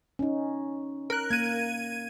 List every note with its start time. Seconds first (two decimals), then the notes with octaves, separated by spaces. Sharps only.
0.19 C#4 D#4
1.10 A#4 F#6
1.31 A#3 G#6 D#7